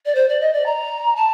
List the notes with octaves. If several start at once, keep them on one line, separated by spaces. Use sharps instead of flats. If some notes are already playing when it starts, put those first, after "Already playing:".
D5
C5
D5
D#5
D5
A#5
A5